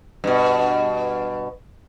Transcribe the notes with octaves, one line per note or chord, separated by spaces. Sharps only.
G2 B2